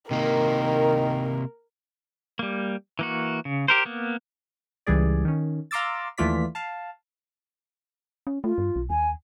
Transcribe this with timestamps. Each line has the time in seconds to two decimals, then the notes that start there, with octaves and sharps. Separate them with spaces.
0.11 C3 D#3 A#3 A#4
2.39 G3 A#3
2.99 E3 A#3 F#4
3.45 C#3
3.68 G4 A#4 C5
3.85 A#3 B3
4.87 C#2 E3 G3 G#4 D5
5.25 D#3 C#4
5.71 F5 A#5 C6 D6 E6 A6
6.18 D#2 E3 A3 F4 D5 B6
6.55 F5 A5
8.27 C#4
8.44 A3 F4
8.58 G2
8.76 B1
8.90 D#2 G#5